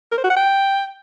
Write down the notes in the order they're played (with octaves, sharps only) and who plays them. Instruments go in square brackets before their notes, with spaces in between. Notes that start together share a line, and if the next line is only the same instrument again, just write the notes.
[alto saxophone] A#4
C5
F#4
F#5
G5